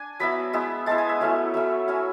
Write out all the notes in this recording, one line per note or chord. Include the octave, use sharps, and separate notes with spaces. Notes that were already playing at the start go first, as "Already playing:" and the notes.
Already playing: D4 G#5
F#3 B3 E4 B5
G#3 B3 E4
G#3 B3 E4 A5
G#5
E5
F#3 A3 C#4 E4
F#3 A3 C#4 E4 E5
F#3 C#4 E4 G#5